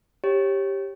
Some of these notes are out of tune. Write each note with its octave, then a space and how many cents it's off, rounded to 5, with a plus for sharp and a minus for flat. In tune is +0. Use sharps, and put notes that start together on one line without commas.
G4 +0 C#5 -25